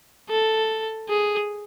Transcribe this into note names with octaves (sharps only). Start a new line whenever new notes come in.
A4
G#4